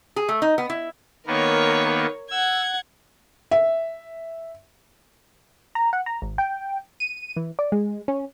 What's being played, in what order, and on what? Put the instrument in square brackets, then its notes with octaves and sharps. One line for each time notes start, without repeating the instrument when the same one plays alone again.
[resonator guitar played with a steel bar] G#4
A3
D#4
B3
E4
[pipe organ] D#3 A#3 B3 [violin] A#4 C#5
[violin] F#5 G#6 [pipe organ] E6
[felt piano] E5
[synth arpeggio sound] A#5
F#5
A#5
G#1
G5
D#7
E3
D5
G#3
C#4